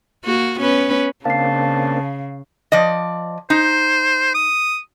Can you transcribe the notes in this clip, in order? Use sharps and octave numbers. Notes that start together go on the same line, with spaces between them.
A#3 F#4
B3 C#4 B4
C#3 A#3 C4 D4 F5 A5 C7
F3 D5 D#5
D#4 C5
D#6